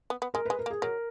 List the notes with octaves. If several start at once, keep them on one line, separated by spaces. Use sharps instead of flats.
B3
B3
G#3 A#4
G#3 B4
A#4
A#3
G#4
F#3 A#4